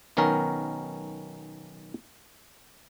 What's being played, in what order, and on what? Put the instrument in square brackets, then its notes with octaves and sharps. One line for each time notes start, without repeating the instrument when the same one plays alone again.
[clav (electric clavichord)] B1 D#3 B3 C#4 A#4